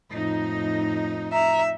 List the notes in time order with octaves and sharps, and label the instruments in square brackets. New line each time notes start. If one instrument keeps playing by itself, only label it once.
[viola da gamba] F2 A2 [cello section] D#4
[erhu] E5 [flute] A#5